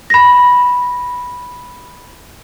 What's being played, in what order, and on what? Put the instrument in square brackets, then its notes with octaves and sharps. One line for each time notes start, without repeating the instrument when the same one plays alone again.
[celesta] B5 A#6